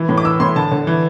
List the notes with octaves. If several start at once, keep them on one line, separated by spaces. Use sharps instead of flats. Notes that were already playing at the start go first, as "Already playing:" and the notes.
Already playing: E3
A2
D6
E3 E6
A2 C6
D3 A5
D3
E3